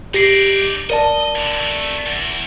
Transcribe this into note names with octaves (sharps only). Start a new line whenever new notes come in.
D#4 G4 D5 A#6 C7
A#4 D5 D#5 A5
A#2 D3
C3 A3
E2